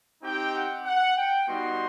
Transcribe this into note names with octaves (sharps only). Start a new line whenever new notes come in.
C4 D#4 G4 G5
F#5
F#5
G5
G3 B3 D#4 F#4 C6